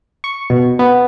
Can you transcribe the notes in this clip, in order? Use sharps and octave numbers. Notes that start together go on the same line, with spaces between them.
C#6
B2
B3